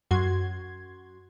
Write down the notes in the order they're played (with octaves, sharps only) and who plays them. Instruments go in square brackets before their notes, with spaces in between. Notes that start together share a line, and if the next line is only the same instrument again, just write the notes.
[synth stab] F#2 F#4 C6 G#6